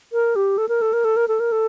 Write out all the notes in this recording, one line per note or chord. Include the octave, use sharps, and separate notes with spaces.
A#4
G4
A4
A#4
A4
A#4
A4
A#4
A4
A#4
A4